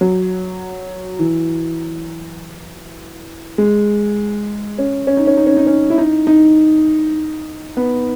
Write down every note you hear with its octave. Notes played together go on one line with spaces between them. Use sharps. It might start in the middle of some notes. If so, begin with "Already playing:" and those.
F#3
E3
G#3
C#4
C#4
D#4
C#4
D#4
C#4
D#4
C#4
E4
D#4
D#4
B3